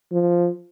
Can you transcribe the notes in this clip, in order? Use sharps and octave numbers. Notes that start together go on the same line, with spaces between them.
F3